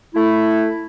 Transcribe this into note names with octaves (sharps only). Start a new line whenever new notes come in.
A3 E4